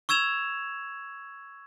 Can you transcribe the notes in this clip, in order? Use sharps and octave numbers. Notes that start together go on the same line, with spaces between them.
C#6 E6 G#6 E7 F7